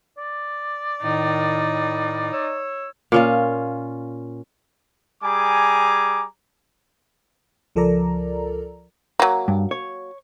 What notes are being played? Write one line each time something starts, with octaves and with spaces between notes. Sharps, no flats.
D5
A2 D#3 D#4
C#5 E6
A#2 C#4 F4
G3 G#4 G#5 A#5 D6
C#2 F3 A4 A#4 D5 A#5
F#3 A#3
G2
C#5